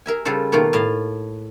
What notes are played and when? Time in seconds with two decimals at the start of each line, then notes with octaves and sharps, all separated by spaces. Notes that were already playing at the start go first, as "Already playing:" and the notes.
0.06 G#4 A#4 E5 G#5
0.25 C#3 G3 F4 A4 C5
0.52 B2 D#3 A3 A#3 F4
0.73 A2 D#5 F5